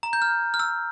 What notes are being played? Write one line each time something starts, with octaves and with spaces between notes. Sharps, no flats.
A#5
G6
F6
F6
E6